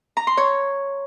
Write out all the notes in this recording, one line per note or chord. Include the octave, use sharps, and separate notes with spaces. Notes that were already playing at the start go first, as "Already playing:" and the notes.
A#5
C6
C#5